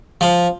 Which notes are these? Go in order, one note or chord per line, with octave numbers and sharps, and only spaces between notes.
F3